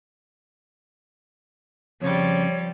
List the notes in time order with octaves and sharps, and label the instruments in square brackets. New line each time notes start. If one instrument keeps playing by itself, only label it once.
[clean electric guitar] F2 C#3 [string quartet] F3 G3 [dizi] C#5